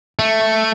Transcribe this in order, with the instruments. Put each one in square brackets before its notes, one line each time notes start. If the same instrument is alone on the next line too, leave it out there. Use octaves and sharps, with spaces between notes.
[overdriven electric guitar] A3